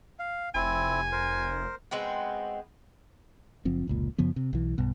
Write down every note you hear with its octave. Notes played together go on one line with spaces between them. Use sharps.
F5
F1 C4 E4 G#5
A#4 C5
G#3 B3 C4 F#4
F#1 F3 C4
F1 C#2 A#2
F#2 C#3 F3 B3
C3
B1 E3
B1 G2 B2